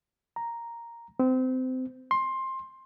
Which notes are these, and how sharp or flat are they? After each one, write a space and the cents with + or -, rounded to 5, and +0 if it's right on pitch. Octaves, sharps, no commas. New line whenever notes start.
A#5 +0
C4 -25
C6 +15